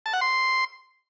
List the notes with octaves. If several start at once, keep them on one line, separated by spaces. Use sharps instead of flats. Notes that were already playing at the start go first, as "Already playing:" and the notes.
A5
F#5
C6